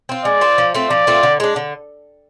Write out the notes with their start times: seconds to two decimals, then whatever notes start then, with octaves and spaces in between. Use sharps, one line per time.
0.09 C4 F4
0.25 G#3 D5
0.41 C4 F4
0.58 F3
0.74 A3 C4 F4
0.90 F3 D5
1.07 A3 C4 F4
1.23 D3
1.40 G#3 D4
1.56 D3